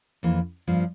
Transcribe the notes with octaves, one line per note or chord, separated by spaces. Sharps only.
F2 E3 A#3
G2 F3 A#3